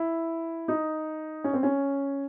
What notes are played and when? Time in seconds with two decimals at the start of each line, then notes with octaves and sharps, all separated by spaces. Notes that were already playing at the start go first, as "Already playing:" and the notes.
Already playing: E4
0.68 D#4
1.44 C#4
1.53 C4
1.63 C#4